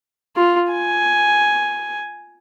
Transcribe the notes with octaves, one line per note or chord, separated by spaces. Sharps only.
F4
G#5